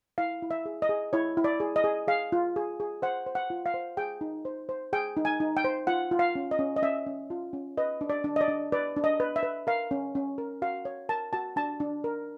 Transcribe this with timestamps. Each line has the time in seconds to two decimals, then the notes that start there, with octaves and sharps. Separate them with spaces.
0.18 E4 F5
0.42 E4
0.51 E5
0.66 G#4
0.82 D#5
0.89 G#4
1.13 E4 C#5
1.37 E4
1.44 D5
1.60 G#4
1.76 D#5
1.84 G#4
2.08 G#4 F5
2.32 F4
2.56 G#4
2.80 G#4
3.02 C5 F#5
3.26 C5
3.35 F#5
3.50 F4
3.66 F5
3.74 C5
3.97 G#4 G5
4.21 D#4
4.45 C5
4.69 C5
4.93 G#4 G5
5.17 D#4
5.25 G#5
5.40 D#4
5.57 G5
5.64 C5
5.87 F4 F#5
6.11 F4
6.19 F5
6.35 C#4
6.51 D#5
6.59 C#4
6.76 D#5
6.82 C#4 E5
7.07 C#4
7.30 F4
7.53 C#4
7.77 B4 D#5
8.01 D4
8.10 D5
8.24 D4
8.36 D#5
8.41 D5
8.48 D4
8.72 B4 D5
8.96 D4
9.04 D#5
9.20 B4
9.36 E5
9.43 B4
9.67 A#4 F5
9.91 C#4
10.15 C#4
10.38 A#4
10.62 F#4 F5
10.85 C#5
11.09 A#4 A5
11.33 F#4 A5
11.56 D4 A5
11.80 D4
12.04 A#4